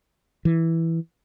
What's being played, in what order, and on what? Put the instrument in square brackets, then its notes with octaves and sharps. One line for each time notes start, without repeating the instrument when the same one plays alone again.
[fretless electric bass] E3